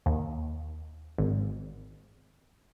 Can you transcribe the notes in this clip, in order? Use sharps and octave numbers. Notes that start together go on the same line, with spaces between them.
D#2
G#1